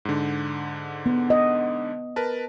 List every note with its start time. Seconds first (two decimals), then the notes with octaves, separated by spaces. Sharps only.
0.05 G#2 D3
1.06 B3
1.30 D#5
2.16 A#4 B4 A5